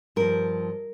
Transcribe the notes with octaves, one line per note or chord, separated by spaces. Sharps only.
G2 F3 A#4